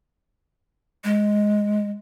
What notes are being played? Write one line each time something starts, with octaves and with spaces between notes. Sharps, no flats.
G#3